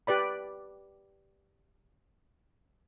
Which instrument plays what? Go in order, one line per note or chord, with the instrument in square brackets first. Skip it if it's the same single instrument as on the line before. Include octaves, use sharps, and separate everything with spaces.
[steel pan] G4 B4 D5 B5